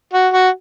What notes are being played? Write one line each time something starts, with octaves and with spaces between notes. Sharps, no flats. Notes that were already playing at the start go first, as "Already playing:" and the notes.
F#4
F#4